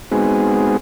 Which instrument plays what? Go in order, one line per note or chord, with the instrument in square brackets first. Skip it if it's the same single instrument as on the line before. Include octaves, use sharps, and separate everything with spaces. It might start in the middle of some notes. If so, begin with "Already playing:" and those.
[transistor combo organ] G#3 B3 C4 D#4 F#4 G#4